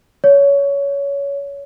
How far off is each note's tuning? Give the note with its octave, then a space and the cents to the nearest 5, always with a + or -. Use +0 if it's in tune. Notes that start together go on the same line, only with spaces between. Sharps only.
C#5 +20